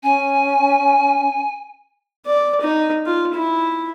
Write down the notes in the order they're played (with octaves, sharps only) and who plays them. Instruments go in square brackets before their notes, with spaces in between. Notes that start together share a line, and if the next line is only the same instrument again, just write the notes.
[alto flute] C#4 [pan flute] G#5
[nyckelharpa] D5
D#4
F4
E4